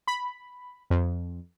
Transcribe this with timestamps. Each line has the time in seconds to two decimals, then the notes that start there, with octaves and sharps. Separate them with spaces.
0.07 B5
0.90 F2